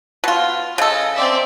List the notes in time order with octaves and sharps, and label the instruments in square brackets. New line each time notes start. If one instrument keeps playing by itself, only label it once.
[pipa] B2 F4
[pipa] C#3 A4 [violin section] D#5
[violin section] C4 D5 E5